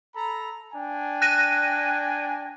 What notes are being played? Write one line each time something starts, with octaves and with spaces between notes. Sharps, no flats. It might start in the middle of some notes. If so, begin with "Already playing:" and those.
A4 A#5 B5
D4 G5 G#5
F#6 A#6 D#7